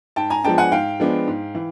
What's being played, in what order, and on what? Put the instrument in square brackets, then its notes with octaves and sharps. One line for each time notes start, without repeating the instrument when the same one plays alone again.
[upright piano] G#2 G5 A5
G#5 A#5
F3 G#3 B3 D4 G5 A5
F#5 G#5
G#2 F5 G5
F3 G#3 B3 D4
G#2
E3